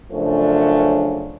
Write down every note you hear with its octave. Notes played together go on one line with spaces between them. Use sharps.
F#2 C#3 F3 A3 C#4 D4